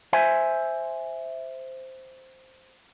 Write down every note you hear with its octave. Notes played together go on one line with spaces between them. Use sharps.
C5 E5 G#5